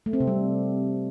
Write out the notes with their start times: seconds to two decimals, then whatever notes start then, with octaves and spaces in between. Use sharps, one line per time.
0.06 A3
0.13 C4
0.20 C3
0.27 G3